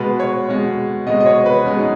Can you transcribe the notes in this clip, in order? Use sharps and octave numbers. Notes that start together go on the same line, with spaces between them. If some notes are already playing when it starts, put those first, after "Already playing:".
Already playing: B2 G#3 B4
C#5
B2 G#3
B2 G#3 D#5
D#5
C#5
B4
B2 G#3 C#4
D#4